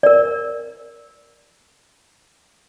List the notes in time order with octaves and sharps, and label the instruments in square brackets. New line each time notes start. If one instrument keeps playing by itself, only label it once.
[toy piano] A#4 D5